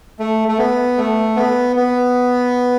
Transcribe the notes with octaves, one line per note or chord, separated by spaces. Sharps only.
A3
A3
B3
A3
B3
B3